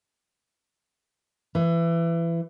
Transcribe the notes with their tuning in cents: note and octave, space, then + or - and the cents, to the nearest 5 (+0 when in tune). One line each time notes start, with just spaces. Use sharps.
E3 +25